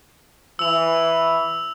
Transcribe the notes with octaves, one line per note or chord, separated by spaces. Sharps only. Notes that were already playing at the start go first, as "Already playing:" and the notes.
E3 E6 F7